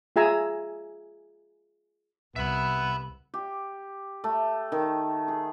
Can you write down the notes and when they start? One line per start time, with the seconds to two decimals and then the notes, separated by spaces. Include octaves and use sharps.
0.16 F4 G#4 E5 G#5 A#5 E6
2.36 C2 B3 E5 B5
3.34 G4
4.24 A3
4.72 D#3
5.28 G#4